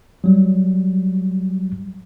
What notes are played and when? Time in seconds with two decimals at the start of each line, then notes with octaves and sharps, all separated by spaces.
0.24 F#3 G3